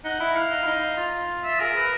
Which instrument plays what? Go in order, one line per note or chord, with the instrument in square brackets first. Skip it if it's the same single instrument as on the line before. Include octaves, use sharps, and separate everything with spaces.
[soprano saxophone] D#4 [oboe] F#5
[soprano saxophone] E4
[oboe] F5
[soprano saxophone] D#4
E4
D#4
F4
[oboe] E5
[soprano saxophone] G#4 [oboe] A#4
[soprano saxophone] B4